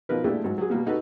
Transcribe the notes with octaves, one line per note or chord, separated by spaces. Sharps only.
B2 F3 D#4 A#4 B4
A#2 G#3 A3 D4 E4 G4
G#2 F#3
F#3 G#4
B2 G3 A#3 B3
D#4 F#4 A4 B4